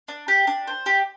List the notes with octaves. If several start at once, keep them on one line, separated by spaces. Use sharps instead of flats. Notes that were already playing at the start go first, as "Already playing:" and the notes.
D4
G4
D4
C5
G4